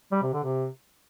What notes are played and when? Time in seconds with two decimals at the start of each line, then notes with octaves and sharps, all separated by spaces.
0.12 G3
0.23 C3
0.33 D3
0.44 C3